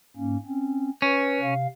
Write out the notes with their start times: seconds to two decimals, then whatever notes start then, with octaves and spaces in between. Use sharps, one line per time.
0.17 G#2 A#3 C#4
0.46 C4 C#4
1.02 C#4 B4
1.41 C3 F5